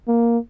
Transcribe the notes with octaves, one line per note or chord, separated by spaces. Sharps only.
A#3